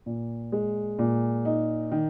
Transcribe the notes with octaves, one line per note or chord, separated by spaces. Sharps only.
A#2
G#3
A#2
D#4
D#3